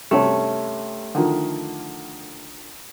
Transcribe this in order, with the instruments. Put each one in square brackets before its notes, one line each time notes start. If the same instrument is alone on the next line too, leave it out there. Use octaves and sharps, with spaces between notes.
[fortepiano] G2 C3 C#4 [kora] A3
[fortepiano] D3 D#3 F3